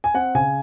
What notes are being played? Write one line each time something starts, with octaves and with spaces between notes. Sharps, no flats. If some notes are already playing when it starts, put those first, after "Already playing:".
G#5
C4 F#5
C#3 G#5